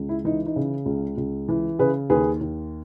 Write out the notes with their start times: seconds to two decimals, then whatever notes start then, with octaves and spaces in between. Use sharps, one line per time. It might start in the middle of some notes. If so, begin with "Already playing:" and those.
Already playing: C#2
0.09 E4
0.25 E3 D#4
0.46 D#4
0.56 C#3
0.86 C#2
1.17 C#2
1.49 E3
1.79 C#3 G#4 B4
2.10 D#2 G#4 B4
2.41 D#2